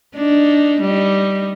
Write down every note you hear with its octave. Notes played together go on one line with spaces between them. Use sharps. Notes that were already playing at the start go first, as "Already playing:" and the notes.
D4 D#4
G3 D#4